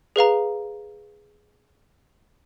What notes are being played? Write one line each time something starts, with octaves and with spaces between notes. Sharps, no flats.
G#4 B4 F5 A#5